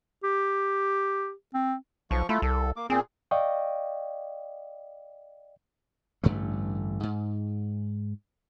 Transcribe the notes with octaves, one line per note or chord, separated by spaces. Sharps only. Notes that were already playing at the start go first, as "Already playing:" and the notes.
G4
C4
B1 F3 C#6
A3 E4 F4 A4
C2 A4
A#3 D6
A#2 C4 G#4
D5 D#5 F5 G5 C#6
A1 G2 D3 A3
G#2